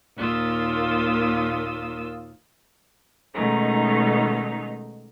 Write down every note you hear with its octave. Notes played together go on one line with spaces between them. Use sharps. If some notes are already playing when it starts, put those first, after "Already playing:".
D#2 A#2 A#3 F4 D#6 E6
B2 D#3 G#3 A3 C#4 D#4